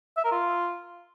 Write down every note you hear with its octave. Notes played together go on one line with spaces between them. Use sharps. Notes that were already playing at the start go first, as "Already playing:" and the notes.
E5
A#4
F4